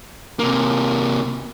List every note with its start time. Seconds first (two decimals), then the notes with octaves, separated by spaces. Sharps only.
0.39 C3 A#3